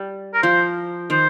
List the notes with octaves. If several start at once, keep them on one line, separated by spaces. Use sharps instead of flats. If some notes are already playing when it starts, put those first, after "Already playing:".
Already playing: G3
A#4
F3 C5
D#3 C5